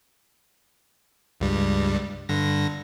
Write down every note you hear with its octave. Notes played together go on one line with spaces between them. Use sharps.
C#2 G2 G3
G2 D3 A#6